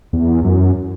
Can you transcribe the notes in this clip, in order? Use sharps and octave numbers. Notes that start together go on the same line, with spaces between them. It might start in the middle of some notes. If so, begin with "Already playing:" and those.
E2
F#2